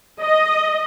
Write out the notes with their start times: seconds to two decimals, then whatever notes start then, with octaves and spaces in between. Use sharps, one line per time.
0.21 D#5